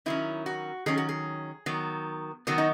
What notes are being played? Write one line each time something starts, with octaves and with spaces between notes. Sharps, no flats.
D#3 F#3 C#4 E4
F#4
D#3 F#3 C#4 G#4
F#4
G#4
D#3 F#3 B3
D#3 F#3 B3 F#4
D#4